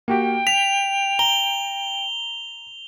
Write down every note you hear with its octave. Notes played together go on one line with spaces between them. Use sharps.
A#3 F#4 G4 G5
B6 F7
A#5 G7